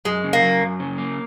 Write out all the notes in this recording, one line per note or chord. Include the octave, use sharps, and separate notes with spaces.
F#2 G#3
C#3
A#3
F#3
F#2
C#3
A#3